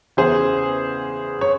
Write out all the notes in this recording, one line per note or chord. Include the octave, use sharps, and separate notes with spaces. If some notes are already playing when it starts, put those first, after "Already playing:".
E2 C#3 E3 G#4 C5
C#5